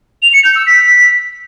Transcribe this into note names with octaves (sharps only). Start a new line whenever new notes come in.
F7
C#7
G6
E6
B6